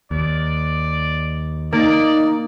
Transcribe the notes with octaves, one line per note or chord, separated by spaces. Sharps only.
D#2 D5
A#3 D#4 D5